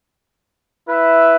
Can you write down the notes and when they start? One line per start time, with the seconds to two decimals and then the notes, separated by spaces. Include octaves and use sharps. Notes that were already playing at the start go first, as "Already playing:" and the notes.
0.88 E4 B4 E5